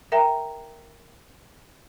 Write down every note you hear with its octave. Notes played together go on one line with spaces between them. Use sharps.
A#4 E5 G5 A#5